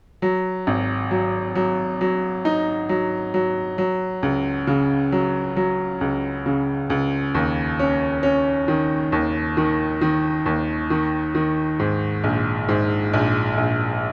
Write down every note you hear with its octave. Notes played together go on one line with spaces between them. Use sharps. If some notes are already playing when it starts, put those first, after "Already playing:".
F#3
G#1
F#3
F#3
F#3
D#4
F#3
F#3
F#3
C#2
C#3
F#3
F#3
C#2
C#3
C#2
D#2
C#4
C#4
D#3
D#2
D#3
D#3
D#2
D#3
D#3
G#2
A#1
G#2
A#1
A#1